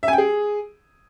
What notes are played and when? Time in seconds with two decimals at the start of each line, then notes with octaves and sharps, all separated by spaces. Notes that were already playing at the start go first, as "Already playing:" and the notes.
0.03 E5
0.08 G#5
0.13 G5
0.18 G#4